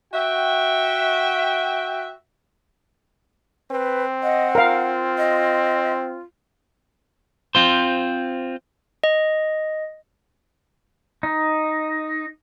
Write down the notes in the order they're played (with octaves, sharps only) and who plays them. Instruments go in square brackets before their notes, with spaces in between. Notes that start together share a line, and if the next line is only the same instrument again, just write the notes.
[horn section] F#4 E5 G5
[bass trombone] C4 [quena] B4
[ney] D#5 [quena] F#5
[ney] F4 [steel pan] A#4 F5
[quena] D#5
[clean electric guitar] C4 F4 C5
[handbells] D#5
[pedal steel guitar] D#4